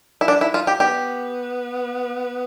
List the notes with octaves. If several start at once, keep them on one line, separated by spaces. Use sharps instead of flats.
E4
D4
E4
F4
G4
B3 G4